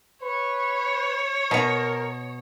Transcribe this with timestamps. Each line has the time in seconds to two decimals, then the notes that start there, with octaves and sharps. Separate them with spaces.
0.23 B4 C#5
1.51 B2 A#4 A#5